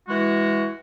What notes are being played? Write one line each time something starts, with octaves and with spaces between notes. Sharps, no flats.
E3 G#3 F#4